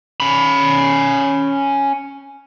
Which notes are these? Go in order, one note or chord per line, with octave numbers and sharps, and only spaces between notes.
C#4 B5